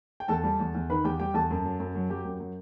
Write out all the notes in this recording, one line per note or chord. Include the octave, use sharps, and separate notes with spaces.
G5
E2 A4 A5
G3
E2
E2
D#3 B4 B5
E2 G4 G5
G3 G4 G5
E2 A4 A5
F#2
F#3
F#2
F#3
F#3 G4 G5
F#2
F#3